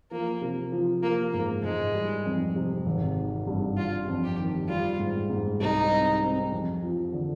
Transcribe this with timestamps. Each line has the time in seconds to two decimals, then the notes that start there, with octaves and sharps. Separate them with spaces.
0.11 F3 A#3
0.41 C3
0.72 F3
1.02 F3 A#3
1.33 G#2 A#3
1.64 G#2 G#3
1.94 G3
2.25 F2
2.56 C3
2.86 G#1
3.16 D#3
3.47 G2
3.77 G3 F4
4.08 F2
4.24 G4
4.39 D#3
4.69 G3 F4
4.99 G#2
5.30 G#2
5.60 C2 D#4
5.91 C4
6.22 C4
6.52 F2
6.83 F3
7.13 D3